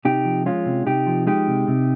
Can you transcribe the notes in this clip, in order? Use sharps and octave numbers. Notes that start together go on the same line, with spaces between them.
C3 D#4 G4
F3
G#3 C#4 F4
C3
C3 D#4 G4
F3
G#3 D#4 G4
C3
C3